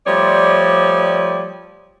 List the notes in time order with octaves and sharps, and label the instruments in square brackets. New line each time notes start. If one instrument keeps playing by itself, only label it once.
[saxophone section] F3 G3 A3 C#5 D5